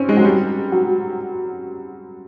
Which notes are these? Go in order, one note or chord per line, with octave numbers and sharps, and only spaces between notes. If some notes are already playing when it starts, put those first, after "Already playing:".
Already playing: C4 C#4
G#3
F#3
G3
F#3